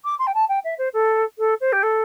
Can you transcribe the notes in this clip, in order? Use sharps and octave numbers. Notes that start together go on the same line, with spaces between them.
D6
C6
G5
A5
G5
E5
C5
A4
A4
C5
G4
A4